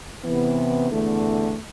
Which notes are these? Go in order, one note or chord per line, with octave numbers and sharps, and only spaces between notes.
C3 E3 B3
E2 D3 A3